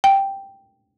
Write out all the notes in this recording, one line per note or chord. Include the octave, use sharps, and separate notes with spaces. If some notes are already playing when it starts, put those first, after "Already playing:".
G5